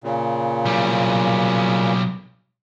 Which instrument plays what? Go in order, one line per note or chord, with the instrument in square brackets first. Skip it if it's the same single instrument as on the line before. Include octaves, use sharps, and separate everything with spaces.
[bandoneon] A#2 C#3
[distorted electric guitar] B1 G3